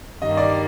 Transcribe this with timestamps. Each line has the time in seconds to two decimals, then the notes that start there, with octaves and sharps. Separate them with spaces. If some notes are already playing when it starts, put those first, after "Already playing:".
0.21 G2 D#3 G3 A#3 D#5
0.37 D5